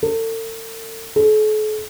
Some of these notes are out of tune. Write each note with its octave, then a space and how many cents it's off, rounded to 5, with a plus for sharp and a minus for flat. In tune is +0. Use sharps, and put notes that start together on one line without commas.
A4 +40
A4 -45